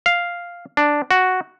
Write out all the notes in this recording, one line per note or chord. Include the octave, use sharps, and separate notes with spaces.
F5
D4
F#4